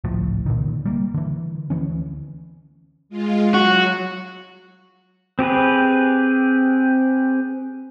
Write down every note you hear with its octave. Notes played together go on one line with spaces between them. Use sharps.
G#1 C#2 A2 F3
C2 A#2 D3 D#3
G3 A#3
D3 E3
D2 E3 G#3 C#4
G#3 F4
F#3 F#4
C4 G4 G#4 B4